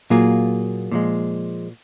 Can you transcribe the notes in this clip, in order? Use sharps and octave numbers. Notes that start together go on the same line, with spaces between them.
A#2 F#3 A#3 F4 G#4
A#2 F3 G#3